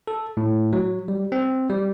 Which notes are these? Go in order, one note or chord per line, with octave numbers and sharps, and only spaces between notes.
A4
A2
F#3
G3
C4
G3